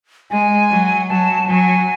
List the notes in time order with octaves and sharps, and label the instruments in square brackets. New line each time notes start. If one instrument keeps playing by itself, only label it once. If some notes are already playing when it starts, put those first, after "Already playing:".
[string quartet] G#3 [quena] G#5
[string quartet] F#3
[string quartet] F#3 [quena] A5
[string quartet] F#3 [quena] G#5